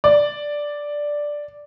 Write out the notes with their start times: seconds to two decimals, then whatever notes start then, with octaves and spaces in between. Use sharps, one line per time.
0.04 D5